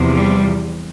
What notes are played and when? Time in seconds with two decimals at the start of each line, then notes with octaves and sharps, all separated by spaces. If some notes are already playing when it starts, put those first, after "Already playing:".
Already playing: E2 C3 F3
0.16 G3